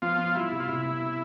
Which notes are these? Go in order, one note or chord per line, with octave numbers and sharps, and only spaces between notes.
F3 B3 F4
B3
G3 E4
C3
F4
C3 E4
B3
C3